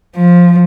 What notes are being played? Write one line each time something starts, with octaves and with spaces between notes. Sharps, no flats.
F3